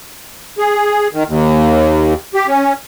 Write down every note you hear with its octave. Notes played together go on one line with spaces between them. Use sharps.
G#4
D#3
D#2
G4
C#4